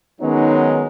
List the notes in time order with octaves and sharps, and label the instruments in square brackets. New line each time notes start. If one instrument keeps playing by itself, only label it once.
[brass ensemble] D#3 F#3 G#3 B3 C#4 D#4